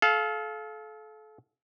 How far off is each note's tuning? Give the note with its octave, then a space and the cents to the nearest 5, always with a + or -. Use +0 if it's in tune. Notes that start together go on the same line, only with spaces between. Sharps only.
A4 -35 F5 +0